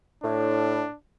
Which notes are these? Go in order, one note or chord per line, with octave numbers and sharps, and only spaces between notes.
A2 D4